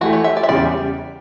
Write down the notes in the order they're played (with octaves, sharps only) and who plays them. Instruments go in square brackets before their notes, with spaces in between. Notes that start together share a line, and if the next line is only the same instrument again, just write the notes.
[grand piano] E3 A3 E4 G4 [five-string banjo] F#4
[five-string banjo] C#5
E5
D5
E5
[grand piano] E2 C#3 G3 C#4 G4 [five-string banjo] D5